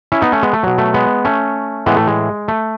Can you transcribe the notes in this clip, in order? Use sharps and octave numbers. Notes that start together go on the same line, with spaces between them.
C#4 E4
B3 D#4
A3 C#4
G#3 B3
A3
B2 F#3
A3
G#3 B3
A3 C#4
A2 E3 G#3 B3
A3
G#3
A3